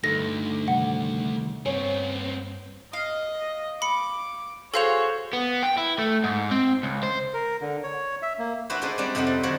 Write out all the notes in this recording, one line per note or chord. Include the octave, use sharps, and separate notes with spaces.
D2 G2 D#4 A4 A#6
C3 D#3 G3 F#5
G2 B3 C4 C#5 G#5
D#5 F5
B5 D6 C#7
F#4 G#4 A4 C5 C#5 F5 F7
B3
G5
E4
A3
G#2
C4
C#2
C5
A#4
D3
C#5
E5
A#3
D4 E4 F#4 B4 C5
C#4 D#4 G#4 B4 C5 D5
G3 C4 D4 D5
F2 C3 D#4 A4 C5 F#5
G3
D3 F3 F#3 C#5 F#5